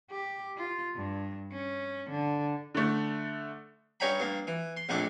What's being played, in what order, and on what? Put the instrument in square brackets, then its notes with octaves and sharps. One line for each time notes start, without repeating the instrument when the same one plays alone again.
[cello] G4
F4
G2
C#4
D3
[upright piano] D3 A3
[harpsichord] G2 C#4 C#5 G5 A#5 B5
G2 A#3
E3
C6
A#1 F2 A#2 A3 D4